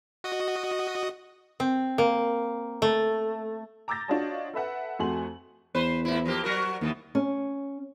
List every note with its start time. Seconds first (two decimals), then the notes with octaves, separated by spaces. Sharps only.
0.24 F#4 D#5 D#6
1.60 C4
1.98 A#3
2.82 A3
3.88 A#5 D6 E6 G6 A6 A#6
4.08 D4 F4 F#4 C#5 D#5 A5
4.54 A4 B4 E5 F#5
4.99 F2 A3 F#4 G#5 C6 F#7
5.75 E2 B4 C5
6.05 A2 E4
6.25 F3 A#3 G4
6.44 F#3 F#4 A#4
6.81 D#2 B2 E3 B3
7.15 C#4